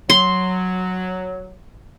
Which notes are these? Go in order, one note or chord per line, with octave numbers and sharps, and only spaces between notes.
F#3 C6